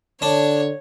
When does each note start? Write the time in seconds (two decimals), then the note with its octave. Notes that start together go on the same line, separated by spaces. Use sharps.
0.22 D3 D4 C#5